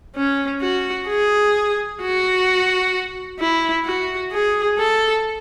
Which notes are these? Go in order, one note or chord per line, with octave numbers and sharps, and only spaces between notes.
C#4
F#4
G#4
F#4
E4
F#4
G#4
A4